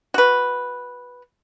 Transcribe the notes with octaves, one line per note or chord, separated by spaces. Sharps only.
F#4 B4